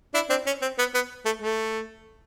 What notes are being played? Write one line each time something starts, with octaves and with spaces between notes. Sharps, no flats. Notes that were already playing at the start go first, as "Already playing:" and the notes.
D4 E4
C4 D4
C#4
C4
B3
B3
A3
A3